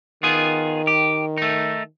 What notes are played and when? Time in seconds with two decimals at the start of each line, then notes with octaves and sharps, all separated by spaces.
0.23 D#3 B3 F4 G#4
0.87 G4
1.38 A3 D#4